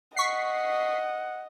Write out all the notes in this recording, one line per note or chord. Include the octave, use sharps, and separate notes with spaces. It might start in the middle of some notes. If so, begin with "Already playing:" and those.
D#5 F#5 C#6 B6 C7